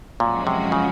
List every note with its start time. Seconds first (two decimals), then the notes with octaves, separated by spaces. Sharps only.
0.20 F#2 A#2 F3 G#3 C#4 F#4
0.47 C3
0.72 C#3